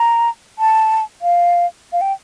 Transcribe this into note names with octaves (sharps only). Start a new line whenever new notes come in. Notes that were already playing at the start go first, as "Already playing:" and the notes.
Already playing: A#5
A5
F5
F5
G5